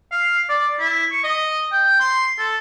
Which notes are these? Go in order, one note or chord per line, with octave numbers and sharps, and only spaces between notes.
F5
D5
E4
C#6
D#5
G5
C6
A4